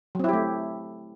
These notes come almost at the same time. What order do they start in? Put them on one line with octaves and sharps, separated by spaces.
F#3 C4 E4 G4 A3